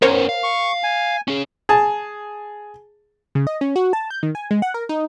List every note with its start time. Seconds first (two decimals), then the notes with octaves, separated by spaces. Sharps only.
0.02 B3 C#4 A#4 C5 C#5
0.29 F5
0.43 C#6
0.84 G#5
1.28 C#4 G#4
1.69 G#4 A5
3.35 C#3
3.47 D#5
3.61 C#4
3.76 F#4
3.93 A5
4.10 G6
4.23 D#3
4.35 G#5
4.51 G#3
4.62 F#5
4.74 A#4
4.89 D#4